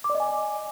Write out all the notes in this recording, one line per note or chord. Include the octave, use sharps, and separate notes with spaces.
D6
D5
D#5
G#5